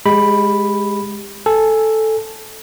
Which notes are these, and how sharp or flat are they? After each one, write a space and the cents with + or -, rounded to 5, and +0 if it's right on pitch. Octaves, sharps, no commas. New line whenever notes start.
G#3 +0 G4 +20 B5 +0
A4 +0 G#5 -5